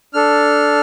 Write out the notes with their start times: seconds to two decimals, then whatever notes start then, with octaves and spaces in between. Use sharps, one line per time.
0.14 D4 A4 F6